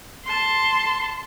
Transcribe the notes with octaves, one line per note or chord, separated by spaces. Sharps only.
A5 C6